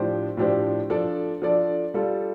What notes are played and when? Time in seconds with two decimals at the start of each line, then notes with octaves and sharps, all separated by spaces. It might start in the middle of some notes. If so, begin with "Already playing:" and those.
Already playing: A2 F3 D4 G4 C5
0.37 A2 F3 D4 G4 C5
0.90 F3 D4 A4 D5
1.42 F3 D4 A4 D5
1.94 G3 F4 A4